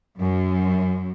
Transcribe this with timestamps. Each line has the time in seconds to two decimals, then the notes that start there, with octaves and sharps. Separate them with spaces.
0.17 F#2